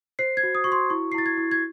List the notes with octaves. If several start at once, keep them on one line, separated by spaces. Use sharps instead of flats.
C5 C7
G#6
F#4
D#6
F#4 C#6
C6
E4 C#6
C7
E4 A6
G#6
E4
G#6